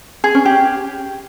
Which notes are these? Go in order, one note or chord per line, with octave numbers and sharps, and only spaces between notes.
G#4
C#4
G4